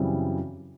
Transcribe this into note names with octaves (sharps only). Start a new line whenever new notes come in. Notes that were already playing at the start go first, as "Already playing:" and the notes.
Already playing: F#2 C#3 E3 G3 C4